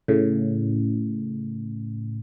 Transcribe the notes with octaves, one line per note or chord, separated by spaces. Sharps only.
A2 C#3